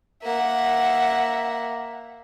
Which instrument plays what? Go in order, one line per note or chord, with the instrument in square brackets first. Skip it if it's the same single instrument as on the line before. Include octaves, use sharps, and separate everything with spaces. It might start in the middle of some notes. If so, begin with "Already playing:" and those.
[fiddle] A#3 [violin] E5 F#5